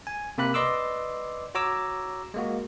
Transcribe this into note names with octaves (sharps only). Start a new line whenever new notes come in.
G#5
C3 A#3 G4 B5 F#6
B4 D5 D#5 C6 D6 E6
F#4 C#5 A#5 D6 E6
G#3 A#3 F#4